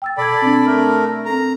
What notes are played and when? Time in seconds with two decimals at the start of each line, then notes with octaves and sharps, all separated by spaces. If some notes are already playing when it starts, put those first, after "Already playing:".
0.02 G5 E6 A6
0.18 B2 A4 D5 B5 G#6
0.42 C4 D4
0.66 A3 A#4
1.26 C4 A4 A#5